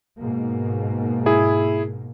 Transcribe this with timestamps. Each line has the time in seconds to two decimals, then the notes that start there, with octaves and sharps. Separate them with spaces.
0.19 G#2 B2 A#3
1.26 E4 G#4